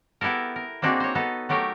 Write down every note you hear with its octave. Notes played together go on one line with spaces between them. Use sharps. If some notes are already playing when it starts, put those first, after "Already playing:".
B3 E4 G4 A4 A#4
A#4
A#3 C4 D4 D#4 F#4 G#4
C5 C#5
B3 D#4 A4
F#3 A3 G4 A#4